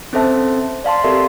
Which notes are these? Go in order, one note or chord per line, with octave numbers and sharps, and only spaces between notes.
C4 C#4 A4 C5 E5 A5
D5 F5 A5 C6
C4 G4 A4 A#4 D5 E5